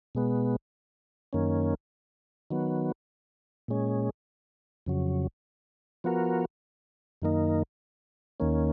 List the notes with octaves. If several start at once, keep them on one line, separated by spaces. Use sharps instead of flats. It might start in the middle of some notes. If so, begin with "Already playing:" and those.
B2 G#3 B3
F#2 D#3 A#3 C#4
D#3 F#3 B3
A#2 G#3 C#4
F2 C#3 F#3
F3 B3 F#4 A#4
F#2 D#3 A#3 D#4
D#2 D#3 A#3 C#4